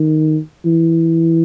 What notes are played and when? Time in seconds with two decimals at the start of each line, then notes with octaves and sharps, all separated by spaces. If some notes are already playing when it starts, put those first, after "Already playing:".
Already playing: D#3
0.65 E3